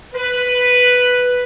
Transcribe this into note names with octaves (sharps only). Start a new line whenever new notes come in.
B4